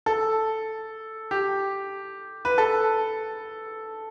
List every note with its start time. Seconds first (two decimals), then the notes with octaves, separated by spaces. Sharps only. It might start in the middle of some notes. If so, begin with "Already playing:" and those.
0.06 A4
1.31 G4
2.45 B4
2.58 A4